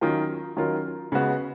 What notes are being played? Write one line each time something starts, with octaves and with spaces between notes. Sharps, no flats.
D#3 F#3 C#4 F4 A#4
D#3 F#3 C#4 F4 A#4
C#3 G#3 B3 F#4